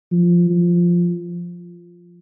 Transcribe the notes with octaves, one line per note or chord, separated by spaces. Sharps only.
F3
F3